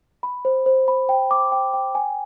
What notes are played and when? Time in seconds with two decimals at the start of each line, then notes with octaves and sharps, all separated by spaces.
0.23 B5
0.45 C5
0.66 C5
0.88 B5
1.09 G5
1.31 D6
1.52 G5
1.74 G5
1.95 G#5